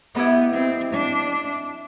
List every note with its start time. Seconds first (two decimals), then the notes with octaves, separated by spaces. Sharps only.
0.15 B3 E4 G4 B4 D#5
0.54 C4
0.94 D4